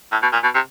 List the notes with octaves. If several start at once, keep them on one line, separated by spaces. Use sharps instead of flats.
A2
B2
A#2
B2
C3